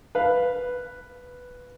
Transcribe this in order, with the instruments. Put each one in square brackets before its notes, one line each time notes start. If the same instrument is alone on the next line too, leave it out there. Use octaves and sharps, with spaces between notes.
[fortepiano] B4 F5